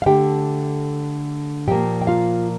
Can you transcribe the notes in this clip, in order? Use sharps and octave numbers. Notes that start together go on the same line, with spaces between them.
F5
D3 A3 G4 G5
A#2 F3 A#3 G4 G5
G5
F4 F5